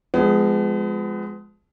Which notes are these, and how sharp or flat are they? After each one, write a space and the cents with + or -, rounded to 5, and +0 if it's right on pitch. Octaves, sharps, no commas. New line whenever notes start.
F3 +0 G#3 -5 B3 +35